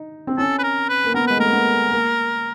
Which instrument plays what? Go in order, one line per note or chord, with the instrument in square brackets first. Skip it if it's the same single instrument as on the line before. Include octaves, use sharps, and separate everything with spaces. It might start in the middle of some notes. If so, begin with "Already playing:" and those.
Already playing: [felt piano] D#4
C4
[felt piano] C#4 [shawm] A4
[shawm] B4
A#4
B4
[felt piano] A#3
[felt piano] B3 [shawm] A#4
[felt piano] G#3 [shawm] B4
[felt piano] A3
[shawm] A#4
[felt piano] A#3
B3
A#3